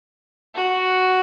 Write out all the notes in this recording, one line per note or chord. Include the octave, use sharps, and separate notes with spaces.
F#4